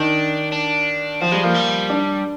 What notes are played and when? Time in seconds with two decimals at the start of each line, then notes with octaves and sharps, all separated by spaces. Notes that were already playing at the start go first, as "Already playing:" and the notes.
Already playing: D#3 D4
0.52 D4
1.21 F3 C4
1.32 G3 G#3
1.44 F3 A#3
1.55 G3
1.90 D4